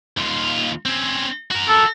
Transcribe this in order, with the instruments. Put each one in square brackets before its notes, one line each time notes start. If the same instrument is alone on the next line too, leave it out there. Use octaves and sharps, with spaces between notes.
[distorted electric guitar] D#2 F4
C4 C#4
F#4 A#4
[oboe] A4